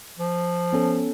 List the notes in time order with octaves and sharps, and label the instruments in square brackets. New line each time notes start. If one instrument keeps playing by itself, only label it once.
[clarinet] F3
[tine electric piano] B3 C#4 A4